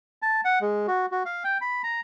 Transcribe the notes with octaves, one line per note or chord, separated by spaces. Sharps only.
A5
F#5
G#3
F#4
F#4
F5
G5
B5
A#5